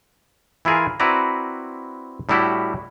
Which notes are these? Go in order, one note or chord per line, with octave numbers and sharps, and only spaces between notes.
E3 E4 F4 G#4 A#4
C4 E4 F#4 B4 D5 A#5
A2 G3 D4 E4 F#4 G4